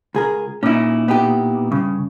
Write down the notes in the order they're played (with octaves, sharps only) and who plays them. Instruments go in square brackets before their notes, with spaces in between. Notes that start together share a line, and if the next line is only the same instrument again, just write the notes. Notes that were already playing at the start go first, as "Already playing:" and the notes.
[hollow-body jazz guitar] C#2 G#4 A#4
[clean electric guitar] A#2 E4 [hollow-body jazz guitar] C#4 D#4
[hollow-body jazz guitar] B3 D#4 G4
[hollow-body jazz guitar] G2 [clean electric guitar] C#3